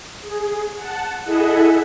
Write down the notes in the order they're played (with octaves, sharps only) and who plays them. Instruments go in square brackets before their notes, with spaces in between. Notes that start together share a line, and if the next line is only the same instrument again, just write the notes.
[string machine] G#4
F#5 A5
E4 G#4 A4 D#5 E5 F#5